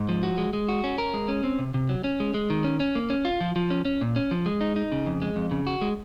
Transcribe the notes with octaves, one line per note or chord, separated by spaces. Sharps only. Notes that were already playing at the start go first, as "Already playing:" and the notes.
Already playing: G#2
F3
F#4
G#3
G#3
F#4
C#4
A#4
G#3
C#4
C4
C3
C3
F#3
C#4
G#3
G#3
D#3
C#4
C#4
A#3
C#4
F4
F3
F3
C#4
C#4
A#2
C#4
F3
G#3
D#4
D#4
C#3
F2
G#3
F2
C#3
F#4
G#3